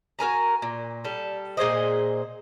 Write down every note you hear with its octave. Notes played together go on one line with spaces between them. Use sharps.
F#4 A#4 G#5 A#5
A#2
G3 A4
A#2 G#4 C5 D#5